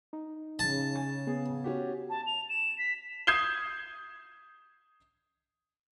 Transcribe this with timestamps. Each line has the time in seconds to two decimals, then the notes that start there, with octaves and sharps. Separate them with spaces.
0.13 D#4
0.59 C#3 A5
0.95 G#5 A6
1.27 B3 G#4
1.64 C#4 F#4 G4
2.10 A5
2.27 F7
2.49 E7
2.78 B6
3.27 D#6 G6 G#6 C7 E7 G7